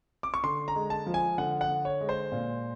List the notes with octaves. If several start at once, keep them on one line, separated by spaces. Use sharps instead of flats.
D6
C#6
D3 C6
A#5
G#3
A5
F3
G#5
D3 F#5
F#5
D3
C#5
G#3
C5
A#2